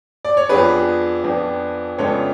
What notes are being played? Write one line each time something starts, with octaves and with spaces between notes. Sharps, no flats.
D5
C#5
F2 F3 B3 D4 G#4 B4
F2 F3 B3 D4
F2 C#3 G#3 B3 D4 A4 C#5